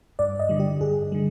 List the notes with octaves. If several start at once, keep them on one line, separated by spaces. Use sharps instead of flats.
G2 D5
D#5
D3 G3
G4
G2 G#4
D3 G3